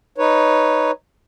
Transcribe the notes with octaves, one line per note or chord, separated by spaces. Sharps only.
D#4 B4 C#5